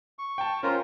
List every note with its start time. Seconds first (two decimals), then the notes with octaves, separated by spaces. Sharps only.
0.19 C#6
0.38 G5 A5
0.63 C#4 F4 A#4 C5